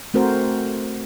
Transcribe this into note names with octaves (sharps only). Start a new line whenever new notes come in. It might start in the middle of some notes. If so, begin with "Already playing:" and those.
A3 C4 F#4 A#4 C5